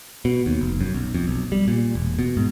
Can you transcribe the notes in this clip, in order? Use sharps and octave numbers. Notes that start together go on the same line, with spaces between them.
B2
D#2
F1
F#2
B1
F2
B1
G3
A#2
E1
B2
G#2